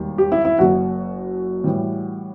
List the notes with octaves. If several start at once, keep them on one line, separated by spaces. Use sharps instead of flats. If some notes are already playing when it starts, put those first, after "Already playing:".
Already playing: E1 D#2 D#3 G3
G4
E4
E4
F#1 F#2 F#3 F#4
A2 E3 G3